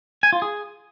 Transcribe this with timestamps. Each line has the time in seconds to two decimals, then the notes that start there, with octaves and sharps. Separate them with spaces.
0.23 G#5
0.33 F4
0.42 G#4